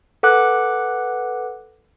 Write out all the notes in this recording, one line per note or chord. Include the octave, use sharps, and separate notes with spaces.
A4 B4 F#5 D6 F#6